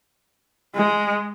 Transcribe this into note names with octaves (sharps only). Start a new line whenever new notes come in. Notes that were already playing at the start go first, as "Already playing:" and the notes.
G#3